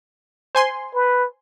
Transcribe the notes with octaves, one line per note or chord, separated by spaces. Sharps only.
C5 G#5 C6
B4